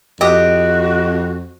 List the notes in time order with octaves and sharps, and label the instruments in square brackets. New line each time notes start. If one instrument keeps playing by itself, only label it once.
[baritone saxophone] F2 [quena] F#4 [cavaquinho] G4 D6 D#6 [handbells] D#5